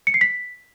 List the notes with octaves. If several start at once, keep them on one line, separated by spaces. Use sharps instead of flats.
C#7
C7
B6